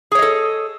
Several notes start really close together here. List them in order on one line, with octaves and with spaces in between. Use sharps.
G#4 C#5 D#5 A4